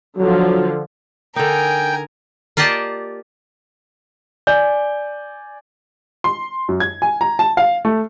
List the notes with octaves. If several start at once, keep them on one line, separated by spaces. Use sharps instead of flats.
D3 F3 F#3
D3 D#4 A#4 G5 G#5
A#3 F4 G4 D5 D#5 A5
D5 G#5 G6
C6
F#2
G#6
G#5
A#5
A5
F5
A3